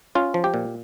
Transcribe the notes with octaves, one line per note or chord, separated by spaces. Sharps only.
C#4 F4
F3
G4
A#2